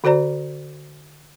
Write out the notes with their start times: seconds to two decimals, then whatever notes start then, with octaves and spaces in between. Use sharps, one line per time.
0.04 D3 F#4 C5 D5 A#5